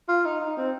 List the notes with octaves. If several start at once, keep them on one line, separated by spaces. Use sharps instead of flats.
F4
D#4
D#4
C4